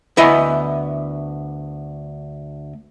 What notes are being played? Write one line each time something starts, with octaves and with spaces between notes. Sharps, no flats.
D2 B3 E4 D#5 G#5